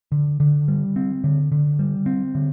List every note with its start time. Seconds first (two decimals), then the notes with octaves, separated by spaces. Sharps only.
0.12 D3
0.40 D3
0.68 G3
0.96 C4
1.24 D3
1.52 D3
1.79 G3
2.06 C4
2.35 D3